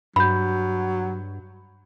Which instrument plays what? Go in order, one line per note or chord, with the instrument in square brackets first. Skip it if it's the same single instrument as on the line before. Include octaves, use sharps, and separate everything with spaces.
[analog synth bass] G2 [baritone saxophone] F#3 [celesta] B5 G6